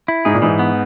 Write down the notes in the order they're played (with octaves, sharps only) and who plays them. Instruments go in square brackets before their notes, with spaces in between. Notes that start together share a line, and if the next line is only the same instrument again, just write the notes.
[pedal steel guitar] E4
[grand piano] G#2 [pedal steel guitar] G#4
[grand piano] A#2
[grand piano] G#2 [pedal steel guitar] E3
[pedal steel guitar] B3